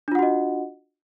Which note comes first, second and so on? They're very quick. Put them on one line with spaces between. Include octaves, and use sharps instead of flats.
D4 F4 F#5 F#4 D#5